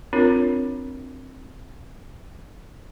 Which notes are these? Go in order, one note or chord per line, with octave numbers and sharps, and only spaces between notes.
C4 D4 F4 A#4 C#5